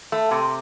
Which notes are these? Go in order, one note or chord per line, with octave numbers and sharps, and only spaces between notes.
A3
C3